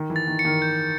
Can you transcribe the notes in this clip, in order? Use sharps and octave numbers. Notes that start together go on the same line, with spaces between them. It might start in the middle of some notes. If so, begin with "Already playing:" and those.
Already playing: D#3
E3
A6
D#3
C#7
D#3
G6